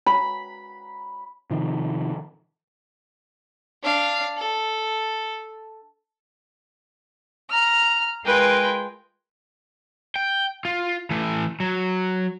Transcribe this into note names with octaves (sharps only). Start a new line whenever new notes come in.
B5
C3 D#3 F3
D4 F5
A4
A#5 F6
G#3 F4 A#4 B4 G5 G#5
G5
F4
E3 A3
F#3